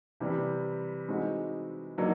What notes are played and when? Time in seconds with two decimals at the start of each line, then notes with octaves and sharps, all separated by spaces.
0.20 C3 E3 G3
1.08 E3 G#3 C4 D#4 F#4
1.98 D3 F#3 A#3 D#4